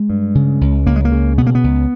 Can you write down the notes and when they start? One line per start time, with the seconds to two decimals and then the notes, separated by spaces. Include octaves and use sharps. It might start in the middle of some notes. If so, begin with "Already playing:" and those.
Already playing: G#3
0.10 G2
0.35 C#3
0.61 C#2
0.86 C#2 A#3
0.96 G#3
1.05 A#3
1.12 C#3
1.38 B2 B3
1.47 A#3
1.55 B3
1.64 C#2